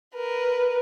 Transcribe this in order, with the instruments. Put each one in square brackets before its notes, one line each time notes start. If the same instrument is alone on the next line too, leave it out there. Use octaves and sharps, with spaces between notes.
[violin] A#4 B4